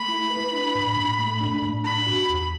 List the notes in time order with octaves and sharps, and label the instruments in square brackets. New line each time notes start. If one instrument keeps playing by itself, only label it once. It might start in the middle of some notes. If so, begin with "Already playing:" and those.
Already playing: [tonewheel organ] A3 [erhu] B5
[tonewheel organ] E4
B4
D4
A2
A2
A3
D4
A2
[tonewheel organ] D4 [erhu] B5
[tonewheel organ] F#4
E2